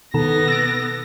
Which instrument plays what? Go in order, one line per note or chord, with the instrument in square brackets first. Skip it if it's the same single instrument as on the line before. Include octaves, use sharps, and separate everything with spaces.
[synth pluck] B2 D#3 A4 [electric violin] B3 A#6
[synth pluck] E6 A6 D7